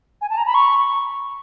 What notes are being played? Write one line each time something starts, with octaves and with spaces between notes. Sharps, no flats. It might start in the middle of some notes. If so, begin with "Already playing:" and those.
G#5
A5
A#5
B5
C#6